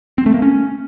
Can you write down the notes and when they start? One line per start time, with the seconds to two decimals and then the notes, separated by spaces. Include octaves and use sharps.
0.18 C4
0.26 A3
0.34 A#3
0.42 C#4